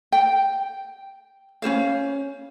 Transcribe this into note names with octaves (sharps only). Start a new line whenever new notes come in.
G5
C#4 F4 C5 F5